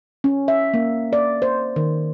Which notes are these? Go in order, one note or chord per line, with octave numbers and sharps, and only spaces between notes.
C#4
E5
A#3
D5
C5
D#3